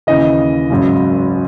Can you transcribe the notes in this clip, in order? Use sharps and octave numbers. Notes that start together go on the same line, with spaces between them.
D#2 C#3 E3 D#5
G#1 F#2 C#3